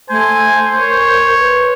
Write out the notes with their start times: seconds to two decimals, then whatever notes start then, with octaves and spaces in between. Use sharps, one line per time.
0.10 A3 C5 G#5
0.78 A#4 C#5
1.38 B4